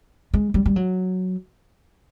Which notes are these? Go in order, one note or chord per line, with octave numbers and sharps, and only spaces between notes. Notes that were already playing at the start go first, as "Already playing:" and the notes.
G#3
G3
G3
F#3